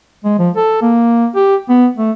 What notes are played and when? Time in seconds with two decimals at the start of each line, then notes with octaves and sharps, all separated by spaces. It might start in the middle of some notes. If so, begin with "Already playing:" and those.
0.25 G#3
0.39 F3
0.56 A4
0.82 A#3
1.35 G4
1.69 B3
1.98 A3